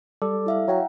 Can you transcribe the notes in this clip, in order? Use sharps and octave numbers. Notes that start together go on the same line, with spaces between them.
G3 A4 D5 D6
E4 E5 F5
F#3 F#5 G5 A#5